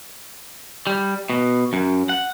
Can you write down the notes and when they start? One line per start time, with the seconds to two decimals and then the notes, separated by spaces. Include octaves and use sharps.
0.87 G3
1.30 B2
1.73 F#2
2.09 F#5